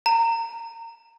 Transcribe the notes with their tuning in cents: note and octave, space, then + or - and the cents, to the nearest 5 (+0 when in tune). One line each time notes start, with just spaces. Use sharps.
A#5 -25